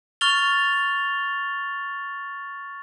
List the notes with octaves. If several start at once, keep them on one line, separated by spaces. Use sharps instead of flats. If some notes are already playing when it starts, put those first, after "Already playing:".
C#6 F6 A6 F7 G7